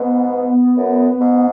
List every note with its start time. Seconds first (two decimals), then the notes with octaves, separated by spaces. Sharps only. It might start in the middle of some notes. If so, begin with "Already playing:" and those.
Already playing: G#2 B3
0.77 F#2
1.21 G#2